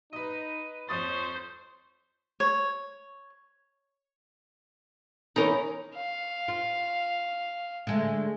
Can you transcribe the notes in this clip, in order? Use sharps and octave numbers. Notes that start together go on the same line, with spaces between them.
D#4 B4 D#5 D#7
F2 C5 C#5 C#6 D#6 A6
C#5
E3 C#4 D#4 A#4 C#5
F5
F4
D3 G#3 A3